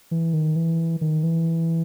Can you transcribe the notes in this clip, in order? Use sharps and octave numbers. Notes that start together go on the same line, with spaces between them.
E3
D#3
E3
D#3
E3